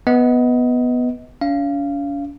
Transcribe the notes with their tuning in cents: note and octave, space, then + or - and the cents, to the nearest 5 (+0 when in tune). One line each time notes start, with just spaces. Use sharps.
B3 +0 D#5 +25
C#4 +45 F5 -20